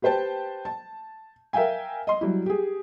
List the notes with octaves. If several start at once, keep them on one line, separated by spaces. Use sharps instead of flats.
G4 B4 C5 G5 A5
A5
A#4 E5 F5 G5 G#5
D#5 C6
F#3 G3 E4
G4 G#4